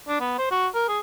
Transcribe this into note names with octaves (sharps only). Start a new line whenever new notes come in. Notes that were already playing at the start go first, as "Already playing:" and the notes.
D4
B3
C5
F#4
A#4
G#4